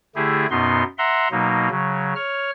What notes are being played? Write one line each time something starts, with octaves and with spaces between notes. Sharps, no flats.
D3 A3 E4 G4 G#4
F#2 B2 B3 D#4 C6
E5 F#5 A#5 C6
B2 F#3 A#3 D#4
C#3 F#3
C#5 F6